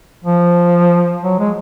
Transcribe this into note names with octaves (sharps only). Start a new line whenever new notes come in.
F3
F#3
G#3